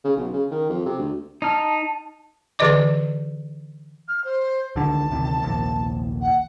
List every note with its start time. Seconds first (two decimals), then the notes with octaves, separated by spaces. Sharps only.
0.04 C#3
0.16 B1
0.33 C#3
0.51 D#3
0.69 F2
0.85 C3
0.98 D2
1.42 D#4 A5 F6
2.59 D3 E3 G4 D5 D#5 D6
4.08 F6
4.24 C5
4.76 C#2 D3 D#3 A5
5.10 D2 C3 D#3
5.43 F1 A#1 D#2
6.21 F#5